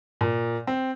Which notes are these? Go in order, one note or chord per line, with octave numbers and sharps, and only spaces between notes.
A#2
C4